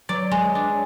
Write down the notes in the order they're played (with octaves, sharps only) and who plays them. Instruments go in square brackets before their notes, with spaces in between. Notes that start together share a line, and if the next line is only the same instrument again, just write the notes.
[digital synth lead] F#3 [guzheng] D5
[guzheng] G#3
D4